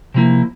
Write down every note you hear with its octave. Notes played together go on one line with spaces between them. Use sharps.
C3 F3 A#3 E4